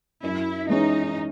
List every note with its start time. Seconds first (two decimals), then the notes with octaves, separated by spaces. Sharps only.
0.23 F#2 E4
0.68 E3 G#3 C#4 D#4